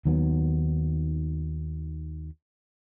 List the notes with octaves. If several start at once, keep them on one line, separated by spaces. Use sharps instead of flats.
D#2 D#3 F#3 B3